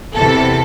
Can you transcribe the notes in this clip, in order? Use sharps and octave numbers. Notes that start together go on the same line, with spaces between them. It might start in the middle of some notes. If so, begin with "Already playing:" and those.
E2 C3 E3 A4